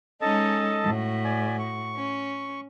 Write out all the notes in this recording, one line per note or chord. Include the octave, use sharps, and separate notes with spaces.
G#3 C#4 D#4 A4 D#5 A5
A2 F#4
D5 G#5
C#6
C#4